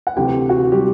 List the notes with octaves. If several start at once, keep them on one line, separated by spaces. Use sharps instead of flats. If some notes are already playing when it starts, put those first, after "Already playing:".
F#5
D2 C3 E3 G4 G5
F#4 F#5
G3 G4